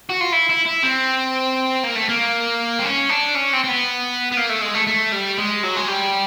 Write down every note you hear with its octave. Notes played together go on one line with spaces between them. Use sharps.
F#4
F4
E4
E4
E4
C4
A#3
A3
A#3
C4
C#4
D4
C#4
C4
C4
B3
B3
A#3
A3
G#3
A3
A3
G3
G#3
F#3
G#3
G3